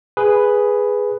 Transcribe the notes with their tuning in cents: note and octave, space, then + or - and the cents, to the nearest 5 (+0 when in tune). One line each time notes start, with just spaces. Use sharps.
G#4 +0 B4 +0